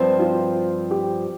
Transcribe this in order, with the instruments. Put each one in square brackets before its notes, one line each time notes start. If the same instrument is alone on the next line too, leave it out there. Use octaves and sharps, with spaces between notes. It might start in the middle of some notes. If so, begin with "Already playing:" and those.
Already playing: [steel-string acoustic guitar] G2 F3 C4
[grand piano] F4
G4